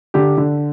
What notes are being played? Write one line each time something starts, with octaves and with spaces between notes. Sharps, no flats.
D3 G4
D3